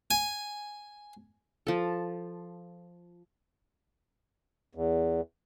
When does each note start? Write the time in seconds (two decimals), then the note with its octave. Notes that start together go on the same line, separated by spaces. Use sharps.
0.11 G#5
1.67 F3 A4
4.75 E2